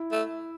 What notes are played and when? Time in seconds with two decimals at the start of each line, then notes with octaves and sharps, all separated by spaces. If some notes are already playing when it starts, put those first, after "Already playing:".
Already playing: E4
0.12 A3